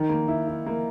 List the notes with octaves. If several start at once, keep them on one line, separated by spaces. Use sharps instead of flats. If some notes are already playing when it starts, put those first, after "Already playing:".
Already playing: D#3
A#3
E4
E4
A#3